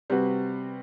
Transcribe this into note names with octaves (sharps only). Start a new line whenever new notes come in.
C3 G3 C4 F#4 B4